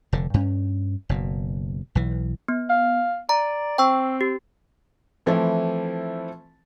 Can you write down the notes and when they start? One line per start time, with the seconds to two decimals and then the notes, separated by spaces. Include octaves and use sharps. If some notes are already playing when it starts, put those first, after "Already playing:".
0.13 F1 D3
0.34 G2 C#4
1.09 F#1 B2
1.95 B1 E3
2.48 B3
2.70 F5
3.29 D5 A#5
3.78 C4 G5 C#6 E6
4.21 G4
5.26 E3 F3 A3 C4 E4